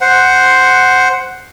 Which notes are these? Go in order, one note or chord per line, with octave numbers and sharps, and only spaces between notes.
C5 F#5